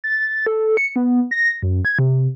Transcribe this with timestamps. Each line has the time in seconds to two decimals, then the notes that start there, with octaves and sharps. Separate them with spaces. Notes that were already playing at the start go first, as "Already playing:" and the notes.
0.04 A6
0.46 A4
0.77 C#7
0.96 B3
1.31 A#6
1.62 F#2
1.85 G#6
1.99 C3